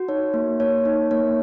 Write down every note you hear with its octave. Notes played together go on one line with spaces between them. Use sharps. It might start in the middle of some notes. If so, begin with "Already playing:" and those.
Already playing: F#4
D#4 C#5
A#3
A#3 C#5
D#4
A#3 C#5